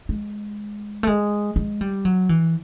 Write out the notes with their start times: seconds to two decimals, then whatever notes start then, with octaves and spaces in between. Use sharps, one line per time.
0.09 G#3
1.03 A3
1.07 G#3
1.56 G#3
1.81 G3
2.05 F#3
2.29 E3